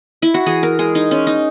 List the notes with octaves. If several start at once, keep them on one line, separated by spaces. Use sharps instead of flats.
E4
F#4
E3 G#4
A#4
G#3 G#4
D#4
G#3 C#4
D#4